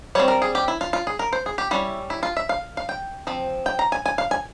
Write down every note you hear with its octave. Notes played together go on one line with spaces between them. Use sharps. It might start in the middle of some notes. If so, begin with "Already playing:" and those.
G3 C4 C#5
A#4
G#4
G4
E4
F4
F4
G#4
A#4
C5
G#4
G4
G3 C#4 E4
E4
F4
E5
F5
F5
G5
F3 C4
G5
A#5
G#5
G#5
F5
G#5